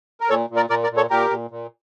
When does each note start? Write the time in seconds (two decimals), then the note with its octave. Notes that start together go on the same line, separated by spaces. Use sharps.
0.21 A#4
0.30 A#2 A4 C#5
0.50 A#2
0.56 A#4 D5
0.70 A#2 A#4 D5
0.83 A#4 D5
0.90 A#2
0.97 A4 C#5
1.10 A#2 G4 A#4
1.30 A#2
1.51 A#2